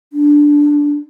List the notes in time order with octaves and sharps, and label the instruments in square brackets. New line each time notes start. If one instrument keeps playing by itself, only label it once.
[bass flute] D4